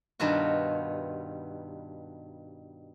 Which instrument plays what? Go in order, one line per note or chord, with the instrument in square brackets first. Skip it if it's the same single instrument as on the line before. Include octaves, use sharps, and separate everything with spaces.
[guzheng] G2 B2 D#3 F4 F#4